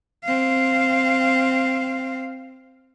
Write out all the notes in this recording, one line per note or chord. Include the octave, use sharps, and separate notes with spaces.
C4 F5